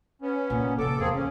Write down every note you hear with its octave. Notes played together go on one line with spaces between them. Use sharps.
B3 C#4
A#2 C4
A1 C3 A4 D6
E2 A#3 C4 G#4
D2 C#4